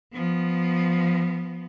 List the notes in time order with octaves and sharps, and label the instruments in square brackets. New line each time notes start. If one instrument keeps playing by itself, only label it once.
[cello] F3 B3